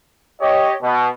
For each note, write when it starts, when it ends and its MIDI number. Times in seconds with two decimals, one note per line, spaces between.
0.41 0.73 67
0.41 0.73 73
0.41 0.73 75
0.81 1.08 47